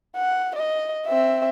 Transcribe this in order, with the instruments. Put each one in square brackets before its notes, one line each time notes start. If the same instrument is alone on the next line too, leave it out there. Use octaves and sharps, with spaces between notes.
[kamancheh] F#5
D#5
C4 E5